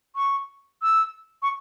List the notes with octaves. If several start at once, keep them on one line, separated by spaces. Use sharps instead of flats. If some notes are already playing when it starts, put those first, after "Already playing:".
C#6
E6
C#6